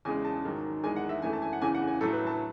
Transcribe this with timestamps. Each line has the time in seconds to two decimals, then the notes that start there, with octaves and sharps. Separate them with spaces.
0.05 E2 C#3 G#3 G#5
0.25 A5
0.45 G#2 D#3 F#3
0.84 E2 D#3 G#3 G#5
0.96 F#5
1.09 E5
1.22 F#2 E3 A3 G#5
1.33 A5
1.42 G#5
1.53 F#5
1.61 E2 C#3 E3 G#5
1.75 F#5
1.87 G#5
2.01 A2 F#3 A3 A4
2.13 B4
2.27 A5